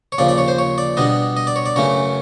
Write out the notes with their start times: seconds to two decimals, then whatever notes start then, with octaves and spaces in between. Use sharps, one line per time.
0.12 C#5
0.18 D#2 C#3 F3 D5
0.28 D5
0.38 C#5
0.48 C5
0.59 C#5
0.78 D5
0.97 B2 G3 B3 D4 D#5
1.37 D#5
1.47 D5
1.56 C#5
1.66 D5
1.76 F#2 C#3 E3 A3 C#4 C#5